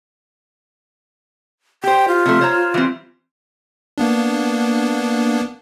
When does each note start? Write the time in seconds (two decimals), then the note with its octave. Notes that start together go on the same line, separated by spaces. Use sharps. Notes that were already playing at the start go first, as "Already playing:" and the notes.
1.84 G4 C5 G5
2.08 F4
2.26 C3 F3 A3
2.41 C5 C#5 A#5
2.74 E3 G3 C4
3.98 A#3 B3 D4